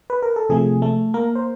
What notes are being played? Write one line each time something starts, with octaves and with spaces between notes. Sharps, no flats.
B4
A#4
A4
C3 F3 A3 G#4
A3 A4
A#3 A#4
C5